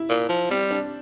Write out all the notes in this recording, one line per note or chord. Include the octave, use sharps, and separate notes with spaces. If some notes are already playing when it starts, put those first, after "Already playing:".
Already playing: E4
A#2
F3
G3 C4
D4